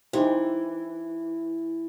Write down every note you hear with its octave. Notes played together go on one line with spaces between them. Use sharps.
E3 D#4 G4 C5